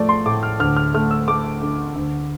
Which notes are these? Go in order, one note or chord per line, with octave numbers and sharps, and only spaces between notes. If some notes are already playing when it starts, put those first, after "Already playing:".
Already playing: A2 F3 A3 D5
C6
A2 D6
F6
D2 F6
F6
A3 F6
E6
A3 D6
D3
D2